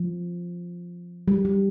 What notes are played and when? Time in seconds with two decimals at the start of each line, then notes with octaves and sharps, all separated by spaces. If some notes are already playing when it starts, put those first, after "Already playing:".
Already playing: F3
1.28 G3
1.45 G3